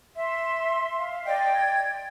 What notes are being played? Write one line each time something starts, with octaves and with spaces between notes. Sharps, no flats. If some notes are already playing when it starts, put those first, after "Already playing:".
E5 C6
F5
D5 D#5 G5
G#6